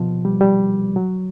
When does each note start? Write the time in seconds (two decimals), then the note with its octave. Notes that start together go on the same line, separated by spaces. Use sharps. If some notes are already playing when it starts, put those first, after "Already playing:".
Already playing: B2 F3
0.25 G3
0.41 G3
0.96 F#3